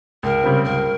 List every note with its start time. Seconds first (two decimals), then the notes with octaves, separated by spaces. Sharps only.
0.23 C#2 A#4
0.43 C#3 G3 C4
0.64 C#2 A#4